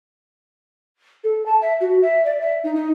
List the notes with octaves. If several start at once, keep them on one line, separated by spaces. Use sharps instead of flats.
A4
A5
E5
F#4
E5
D5
E5
D#4
D#4